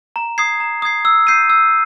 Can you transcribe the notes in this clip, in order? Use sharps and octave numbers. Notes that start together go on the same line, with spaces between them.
A#5
D#6 G#6 C7
A#5
D#6 G#6 C7
E6
G6 C7 D#7
E6